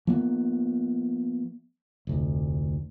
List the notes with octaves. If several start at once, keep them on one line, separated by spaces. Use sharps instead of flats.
F3 A#3 B3
F1 D2